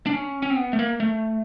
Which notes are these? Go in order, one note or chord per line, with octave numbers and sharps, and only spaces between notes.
D4
C#4
C#4
C4
B3
A3
A#3
A3